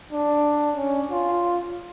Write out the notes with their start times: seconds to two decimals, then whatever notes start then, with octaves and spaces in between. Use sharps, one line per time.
0.13 D4
0.76 C#4
1.11 F4